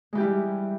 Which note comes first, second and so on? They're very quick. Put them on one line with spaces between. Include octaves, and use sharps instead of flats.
G#3 E3 G4 E4 G3